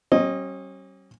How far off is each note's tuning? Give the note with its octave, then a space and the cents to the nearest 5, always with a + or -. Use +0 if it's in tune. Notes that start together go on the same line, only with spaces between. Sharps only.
G3 -45 C#4 -40 D#5 +0